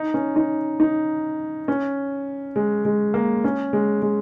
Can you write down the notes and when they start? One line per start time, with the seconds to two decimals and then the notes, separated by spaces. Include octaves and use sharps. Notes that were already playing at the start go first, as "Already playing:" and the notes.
Already playing: D#4
0.14 C#4
0.36 D#4
0.80 D#4
1.68 C#4
2.56 G#3
2.85 G#3
3.14 A#3
3.44 C#4
3.73 G#3
4.02 G#3